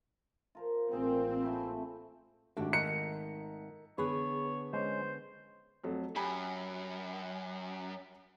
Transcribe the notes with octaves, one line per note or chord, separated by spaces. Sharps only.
F4 A#4 C5
A1 A#2 C4 G#4 G5
A3 G#5 B5
G#1 A3 D4 F#4 G4
A#4 D#5 A#5 C#7
D3 B3 G#4 B4 C#5
G#3 C#4 C5
F2 F#3 A3
F#2 G4 G#5 B5